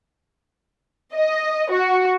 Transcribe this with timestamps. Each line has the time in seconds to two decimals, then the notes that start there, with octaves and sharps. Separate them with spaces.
1.14 D#5
1.71 F#4